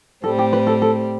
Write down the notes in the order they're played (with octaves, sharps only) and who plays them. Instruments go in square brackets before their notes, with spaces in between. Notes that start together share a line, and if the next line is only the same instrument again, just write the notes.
[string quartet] A2 G3 C4 [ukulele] A4
[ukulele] G4
B4
A4
A4